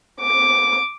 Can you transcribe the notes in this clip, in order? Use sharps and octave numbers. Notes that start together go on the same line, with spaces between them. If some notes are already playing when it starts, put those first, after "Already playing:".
D6